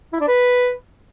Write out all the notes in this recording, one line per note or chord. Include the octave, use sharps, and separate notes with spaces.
E4
D4
B4